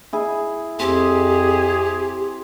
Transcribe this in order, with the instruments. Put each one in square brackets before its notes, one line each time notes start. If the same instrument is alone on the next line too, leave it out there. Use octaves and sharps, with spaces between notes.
[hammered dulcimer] E4 G#4
[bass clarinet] F2 [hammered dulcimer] C4 [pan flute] G4 [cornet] G#4